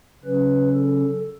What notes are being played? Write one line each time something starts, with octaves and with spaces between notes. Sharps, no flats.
C#3 F#3 C#4 B4
A4